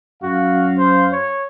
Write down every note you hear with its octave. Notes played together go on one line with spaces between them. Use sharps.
F#2 F#4 F5
C5
C#5